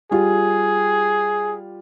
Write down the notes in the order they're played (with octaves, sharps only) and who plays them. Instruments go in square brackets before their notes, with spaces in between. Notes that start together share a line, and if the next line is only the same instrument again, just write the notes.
[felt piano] G3 F4 G4 [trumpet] G#4